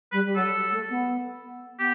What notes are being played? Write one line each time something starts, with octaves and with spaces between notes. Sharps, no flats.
G3 B4
G3
F#3 A4
A3
B3
B3 G4